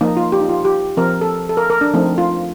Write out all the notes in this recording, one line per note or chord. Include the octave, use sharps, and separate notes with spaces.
F3 A#3 D#4
F4
G4
D#4
F4
G4
F3 C4 A#4
A4
A4
A#4
A#4
D4
F3 A3 C4 D#4
F4